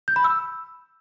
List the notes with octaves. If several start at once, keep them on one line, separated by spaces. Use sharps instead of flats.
G6
B5
E6